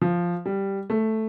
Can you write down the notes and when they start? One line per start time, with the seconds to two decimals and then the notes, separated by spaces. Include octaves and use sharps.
0.01 F3
0.46 G3
0.90 A3